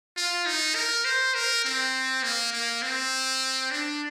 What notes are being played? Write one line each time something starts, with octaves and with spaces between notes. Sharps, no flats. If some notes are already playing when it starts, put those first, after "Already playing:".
F4
D#4
A#4
C5
A#4
C4
A#3
A#3
C4
D4